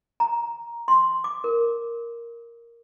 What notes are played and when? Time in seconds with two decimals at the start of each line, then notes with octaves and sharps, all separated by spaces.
0.20 A#5
0.88 C6
1.24 D6
1.44 A#4